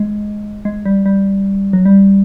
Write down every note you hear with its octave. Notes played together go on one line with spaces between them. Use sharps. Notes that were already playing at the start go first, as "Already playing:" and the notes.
Already playing: G#3
G#3
G3
G3
F#3
G3